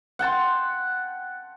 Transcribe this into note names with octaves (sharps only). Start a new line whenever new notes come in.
F#5 G5 A5 C6